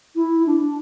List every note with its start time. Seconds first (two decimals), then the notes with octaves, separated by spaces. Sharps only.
0.15 E4
0.46 D4